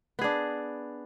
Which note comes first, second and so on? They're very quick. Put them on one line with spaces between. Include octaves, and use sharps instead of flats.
B3 G#4 D4